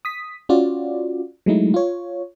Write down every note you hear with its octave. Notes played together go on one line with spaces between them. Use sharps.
D#6 B6
C#4 F4 F#4 D5
F#3 G#3 A3 D#4 E4
F4 C#5